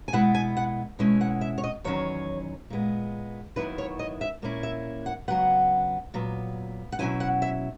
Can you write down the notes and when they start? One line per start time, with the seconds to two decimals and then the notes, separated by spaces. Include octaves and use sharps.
0.08 G#5
0.13 B2 G#3 B3 E4 F#5
0.34 G#5
0.57 F#5
0.99 B2 G#3 C#4 E4
1.21 F#5
1.41 E5
1.58 C#5
1.64 D#5
1.84 E2 D#3 F#3 C#4 C#5
2.70 A#2 G#3 B3
3.56 D#2 D#3 F#3 B3 E4 B4
3.78 C#5
3.99 D#5
4.21 E5
4.42 A#2 A#3 C#4 E4
4.63 E5
5.06 F#5
5.28 C#3 F#3 B3 F#5
6.14 A#2 F#3 B3
6.92 F#5
6.99 B2 F#3 C#4 E4 G#5
7.20 F#5
7.42 E5